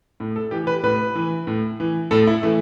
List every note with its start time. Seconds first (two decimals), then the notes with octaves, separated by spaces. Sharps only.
0.20 A2
0.36 A4
0.51 E3 G4
0.67 B4
0.83 A2 B4
1.15 E3
1.47 A2
1.80 E3
2.11 A2 A4
2.27 E4
2.43 E3 A3